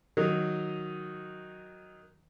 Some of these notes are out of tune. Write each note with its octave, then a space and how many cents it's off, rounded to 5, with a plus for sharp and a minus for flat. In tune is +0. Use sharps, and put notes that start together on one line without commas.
D#3 +0 F#3 +0 D#4 +0